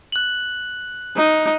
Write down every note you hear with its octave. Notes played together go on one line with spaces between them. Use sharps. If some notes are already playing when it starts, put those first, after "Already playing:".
F#6 F#7
D#4